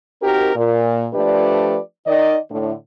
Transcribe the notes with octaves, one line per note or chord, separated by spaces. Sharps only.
C4 D#4 F#4 G4 A#4
A#2
F3 A3 D4 G4 B4 D5
D#3 D5 D#5
A2 D3